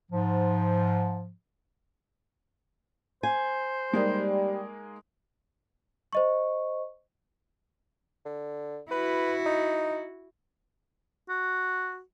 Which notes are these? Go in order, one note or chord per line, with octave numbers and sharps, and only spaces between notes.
G#2 F3
C5 G#5
G3 G#3 A#3 D#4
C5 D#5 C#6
D3
E4 F#4 B4
D#4
F#4